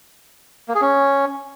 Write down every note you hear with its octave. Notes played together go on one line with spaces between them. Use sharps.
A#3
G#4
C#4